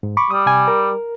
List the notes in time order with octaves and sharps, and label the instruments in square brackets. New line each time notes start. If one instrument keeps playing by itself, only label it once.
[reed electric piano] G#2
B5 C#6 D6
[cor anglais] G3 [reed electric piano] D#6
[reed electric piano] C3 G#5
A#4